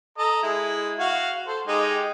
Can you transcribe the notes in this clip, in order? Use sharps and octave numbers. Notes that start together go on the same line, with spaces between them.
A4 D#5 A#5
G#3 E4
F#4 F5
A4 C5
G#3 D#4 G4